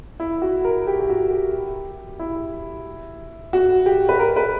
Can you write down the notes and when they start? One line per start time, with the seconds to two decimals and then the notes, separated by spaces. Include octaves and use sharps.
0.20 E4
0.42 F#4
0.65 A#4
0.87 G4
1.00 G4
1.10 F#4
1.31 G4
2.19 E4
3.53 F#4
3.86 G4
4.09 B4
4.19 A#4
4.36 B4